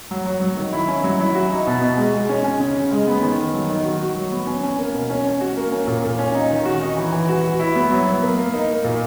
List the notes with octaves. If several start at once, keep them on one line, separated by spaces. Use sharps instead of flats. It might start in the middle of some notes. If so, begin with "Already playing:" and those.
F#3
F#3
F#3
D#3
E4
C#4
F#3
E4
F#4
D#4
B2
B2
G#3
G#3
C#4
C#4
C#3
C#3
G#3
B3
D#3
D#3
F#3
D#3
F#4
F#4
F#3
B3
C#4
C#4
A#3
B2
C#4
C#4
F#4
A#3
C#4
A#2
A#2
C#4
D#4
D#3
F#4
D#4
E3
E3
F#4
F#4
E4
B3
F#3
B3
A#3
A#3
D#4
A#3
A#2